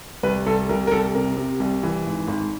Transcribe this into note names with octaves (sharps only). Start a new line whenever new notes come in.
C2 B4
C2 A4
C2 A#4
A#4
C2 A4
C3 A#4
C3
C2
E3
G#1
G#1